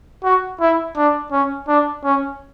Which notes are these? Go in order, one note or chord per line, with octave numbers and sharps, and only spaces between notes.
F#4
E4
D4
C#4
D4
C#4